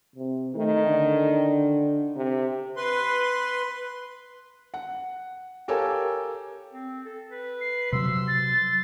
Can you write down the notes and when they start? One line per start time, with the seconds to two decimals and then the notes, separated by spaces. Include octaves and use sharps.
0.16 C3
0.56 D#3 A3
0.86 D3
2.16 C3
2.76 B4 C6
4.74 F#5
5.68 G4 A4 A#4 C#5 F5 G#5
6.73 C4
7.05 A4
7.31 B4
7.61 C7
7.92 C3 F#3 C6 E6
8.28 A6